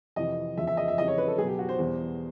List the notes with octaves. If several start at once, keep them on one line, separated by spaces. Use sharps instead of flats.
F2 C3 E3 D#5
E2 C#3 F3 E5
E5
D#5
E5
F2 C#3 E3 G3 D#5
C#5
B4
A4
B2 F#3 G#4
G4
F#4
C5
E2 B2 G3